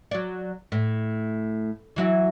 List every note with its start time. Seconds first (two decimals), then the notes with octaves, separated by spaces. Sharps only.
0.11 F#3 D5
0.72 A2
1.96 E3 F#3 E4